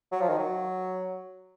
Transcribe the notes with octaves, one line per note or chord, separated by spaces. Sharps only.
F#3
F3
D#3
F#3